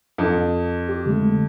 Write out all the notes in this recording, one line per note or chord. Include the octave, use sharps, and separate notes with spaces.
F2
G4
D3 G#3 A3